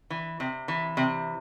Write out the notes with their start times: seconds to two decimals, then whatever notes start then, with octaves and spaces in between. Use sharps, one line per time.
0.10 E3
0.40 C3
0.68 E3
0.97 C3